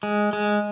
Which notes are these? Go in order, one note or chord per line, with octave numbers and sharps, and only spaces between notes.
G#3
G#3